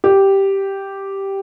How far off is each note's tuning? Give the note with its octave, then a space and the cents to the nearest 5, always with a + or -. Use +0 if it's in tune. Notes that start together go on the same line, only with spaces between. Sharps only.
G4 -5